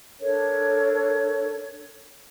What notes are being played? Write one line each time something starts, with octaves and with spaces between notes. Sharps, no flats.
D4 A4 A#4 C#5